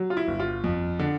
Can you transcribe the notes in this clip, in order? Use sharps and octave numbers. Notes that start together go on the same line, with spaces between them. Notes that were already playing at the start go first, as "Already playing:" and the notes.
Already playing: F#3
F4
E4
G1
F4
F2
D3